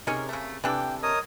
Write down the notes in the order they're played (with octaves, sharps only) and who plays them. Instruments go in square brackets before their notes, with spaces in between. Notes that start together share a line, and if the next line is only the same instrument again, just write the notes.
[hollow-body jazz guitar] C3 G#4 A#4 [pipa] C#4 D#4 C#5
[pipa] C#3 A3
[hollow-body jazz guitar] C3 [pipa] E3 D4 A4 [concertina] G5
[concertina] A#4 C#5 D#5 [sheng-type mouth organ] D#6